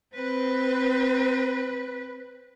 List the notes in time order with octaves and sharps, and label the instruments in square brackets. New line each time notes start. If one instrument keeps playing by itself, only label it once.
[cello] C4 B4